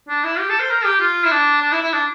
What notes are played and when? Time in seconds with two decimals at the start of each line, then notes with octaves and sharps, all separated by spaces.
0.08 D4
0.24 E4
0.39 G4
0.49 A4
0.60 C5
0.70 A#4
0.85 G4
1.00 F4
1.25 E4
1.31 D4
1.62 D4
1.72 E4
1.82 E4
1.93 D4